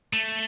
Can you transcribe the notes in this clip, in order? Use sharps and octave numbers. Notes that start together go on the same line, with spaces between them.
A3